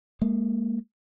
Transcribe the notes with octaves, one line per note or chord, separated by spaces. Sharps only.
G#3 A#3